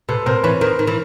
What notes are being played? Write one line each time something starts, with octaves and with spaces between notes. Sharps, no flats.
C3 A4 B4
C3 A#4 C5
E3 B4 C#5
D#3 A#4 C5
D#3
E3